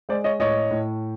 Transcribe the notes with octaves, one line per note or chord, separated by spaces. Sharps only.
G#3 C5 D5
C#5 D#5
A2 C#5 D#5
A2